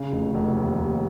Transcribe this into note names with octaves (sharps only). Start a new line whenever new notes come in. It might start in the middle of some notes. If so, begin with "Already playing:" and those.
Already playing: C#3
F1
F1
D#2
D#2